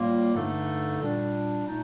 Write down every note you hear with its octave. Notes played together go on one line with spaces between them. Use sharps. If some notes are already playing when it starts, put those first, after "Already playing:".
Already playing: A2 G3 A#3 F4
G2 D3 A3 D#4 A4
A#2 G3 D4
A#2 A3 D#4